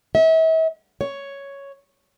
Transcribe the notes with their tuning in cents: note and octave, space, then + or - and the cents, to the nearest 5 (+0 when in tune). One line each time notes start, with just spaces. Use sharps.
E5 -40
C#5 +5